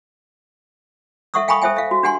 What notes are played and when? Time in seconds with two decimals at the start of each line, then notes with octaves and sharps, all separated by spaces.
1.34 A4 E5 F#5 C#6 D#6 E6
1.48 F5 G5 G#5 B5 C#6 D#6
1.62 A4 C5 E5 G5 G#5
1.77 E5 F5
1.91 F#4
2.03 D4 G4 F#5 G#5 C6